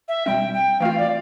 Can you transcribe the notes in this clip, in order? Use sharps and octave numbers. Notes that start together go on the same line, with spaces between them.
E5
B2 G3 C4 G5
G5
E3 A3 C4 F4 F5
D5